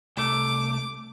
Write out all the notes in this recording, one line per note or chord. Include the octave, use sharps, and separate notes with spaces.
C2 A3 D6